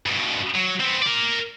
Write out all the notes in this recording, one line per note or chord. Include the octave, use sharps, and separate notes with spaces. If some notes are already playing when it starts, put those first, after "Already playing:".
G2 B2
F#3
B3 C4
A#4 D5